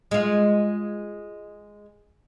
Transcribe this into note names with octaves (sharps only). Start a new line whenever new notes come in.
G#3 F4